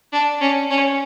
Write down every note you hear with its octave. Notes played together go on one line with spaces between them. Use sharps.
D4
C#4
C#4